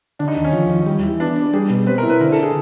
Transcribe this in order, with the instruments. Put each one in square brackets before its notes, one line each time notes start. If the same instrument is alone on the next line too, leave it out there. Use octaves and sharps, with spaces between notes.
[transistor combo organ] D3 [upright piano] D4
[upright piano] D#4
[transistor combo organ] D#2
[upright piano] C#4
[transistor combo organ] F3
D#2
G3
E3
[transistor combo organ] B3 [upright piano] D4
[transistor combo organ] D4
[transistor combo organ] G3 [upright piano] G#4
[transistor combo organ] B2
[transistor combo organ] C4 [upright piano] B4
[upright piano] A#4
[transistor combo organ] E4
[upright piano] B4
[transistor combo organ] D3 [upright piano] A#4
[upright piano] A4
G#4